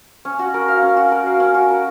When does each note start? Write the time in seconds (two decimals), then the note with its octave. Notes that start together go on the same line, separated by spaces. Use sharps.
0.25 C#4
0.39 F#4
0.54 A#4
0.68 F5
0.82 C#4
0.97 F#4
1.12 A#4
1.26 F5
1.40 C#4
1.55 F#4
1.70 A#4